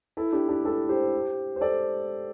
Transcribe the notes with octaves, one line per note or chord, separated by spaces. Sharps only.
E4 A4
D4 G4
D4 G4
E4 A4
G4 C5
C5
A4 D5